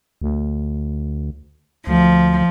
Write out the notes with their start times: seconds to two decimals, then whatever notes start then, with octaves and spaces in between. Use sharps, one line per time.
0.22 D2
1.87 D2 F3